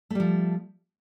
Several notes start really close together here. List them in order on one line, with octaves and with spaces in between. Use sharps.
A3 G3 F3